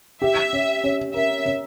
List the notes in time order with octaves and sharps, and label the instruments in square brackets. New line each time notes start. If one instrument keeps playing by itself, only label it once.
[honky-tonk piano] G4 [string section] E5
[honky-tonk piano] C#4
C#4
[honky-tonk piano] A#4 [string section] E5
[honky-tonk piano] C#4